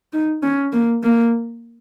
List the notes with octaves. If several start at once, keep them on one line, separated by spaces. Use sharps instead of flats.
D#4
C#4
A#3
A#3